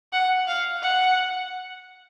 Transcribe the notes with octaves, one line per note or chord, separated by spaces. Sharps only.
F#5
F5
F#5